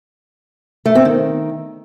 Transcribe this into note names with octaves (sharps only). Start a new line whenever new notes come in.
A3
C4
D#3